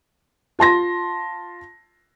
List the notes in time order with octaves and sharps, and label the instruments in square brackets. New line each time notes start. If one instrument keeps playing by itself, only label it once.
[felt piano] F4 A5 C6 A#6